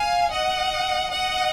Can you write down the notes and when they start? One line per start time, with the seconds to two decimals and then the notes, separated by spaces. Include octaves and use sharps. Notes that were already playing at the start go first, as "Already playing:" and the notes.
Already playing: F5 G#5
0.31 D#5 F#5
1.11 D#5 F#5